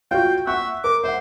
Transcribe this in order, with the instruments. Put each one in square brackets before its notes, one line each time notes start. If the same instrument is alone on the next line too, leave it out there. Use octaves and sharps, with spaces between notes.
[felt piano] F4 F#4 [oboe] G5
[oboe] E5 [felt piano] F#5 C#6 F#6
[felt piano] A#4 [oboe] D6
[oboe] C5 [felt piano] E5 F#5